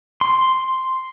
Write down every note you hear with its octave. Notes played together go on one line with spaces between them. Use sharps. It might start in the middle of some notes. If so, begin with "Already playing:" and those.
C6